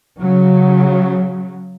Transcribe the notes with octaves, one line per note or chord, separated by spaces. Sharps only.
C#3 F#3